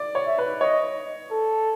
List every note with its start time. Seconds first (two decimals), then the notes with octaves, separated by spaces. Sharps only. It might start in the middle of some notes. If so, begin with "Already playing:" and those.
Already playing: D5
0.15 C#5
0.27 E5
0.38 B4
0.61 C#5 D#5
1.31 A4